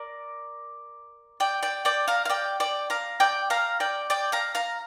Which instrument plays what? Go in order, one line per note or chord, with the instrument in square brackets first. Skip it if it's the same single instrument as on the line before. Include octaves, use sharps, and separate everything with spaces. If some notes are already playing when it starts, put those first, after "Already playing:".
Already playing: [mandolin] A#4 D5
D5 G5
D5 G5
D5 G5
F5 A#5
F5
D5 G5
D5 G5
F5 A#5
D5 G5
F5 A#5
D5 G5
D5 G5
F5 A#5
F5 A#5